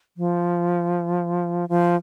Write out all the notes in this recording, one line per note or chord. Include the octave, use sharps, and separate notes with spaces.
F3
F3